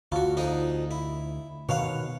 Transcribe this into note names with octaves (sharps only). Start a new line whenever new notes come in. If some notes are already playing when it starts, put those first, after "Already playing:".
D2 F4 F#4
F2 D#4 G#4
E4
B2 D#3 C#5 F5 F#5